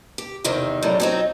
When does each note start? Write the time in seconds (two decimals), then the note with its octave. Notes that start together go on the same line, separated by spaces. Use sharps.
0.18 G4
0.44 E2 C3 D#3 C4
0.83 F#2 A2 G3
1.00 F#3 C4 D#4